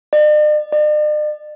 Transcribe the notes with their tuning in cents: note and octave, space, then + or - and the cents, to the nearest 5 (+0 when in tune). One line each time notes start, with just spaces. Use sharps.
D5 +45
D5 +45